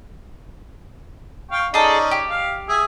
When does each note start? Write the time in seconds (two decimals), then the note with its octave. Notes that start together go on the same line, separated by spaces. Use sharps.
1.51 F5 G5 C#6
1.74 C#4 D#4 G#4 A4 D5
2.11 G4
2.30 F5
2.69 G#4 E5